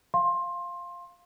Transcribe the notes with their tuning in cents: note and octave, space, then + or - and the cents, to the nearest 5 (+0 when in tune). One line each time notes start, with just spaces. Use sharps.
F5 +0 C6 +20